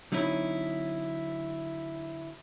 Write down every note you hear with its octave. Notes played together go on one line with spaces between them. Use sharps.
D3 F#3 C4 D#4 E4